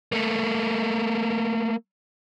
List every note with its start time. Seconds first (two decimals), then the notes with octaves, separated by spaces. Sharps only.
0.12 A3 A#3